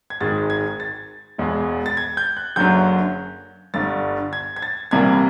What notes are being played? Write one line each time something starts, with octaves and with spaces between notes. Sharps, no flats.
G#6
G#1 G#2 D#3 G#3 A6
G#6
A6
E1 E2 B2 G#3
A6
G#6
G6
F#6
F#1 F#2 D3 F#3 G6
G1 G2 D3 A6
G#6
G#6
A6
C2 C3 E3 G3 A#3 G#6